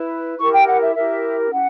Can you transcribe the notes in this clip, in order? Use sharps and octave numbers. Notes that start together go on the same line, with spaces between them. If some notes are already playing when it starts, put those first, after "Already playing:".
Already playing: E4 B4
E4 G4 A#4 C#6
G5
F#5
E5
E4 G4 A#4 E5
C#4 E4 G4 F#5